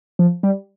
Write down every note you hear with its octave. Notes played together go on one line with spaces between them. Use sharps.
F3
G3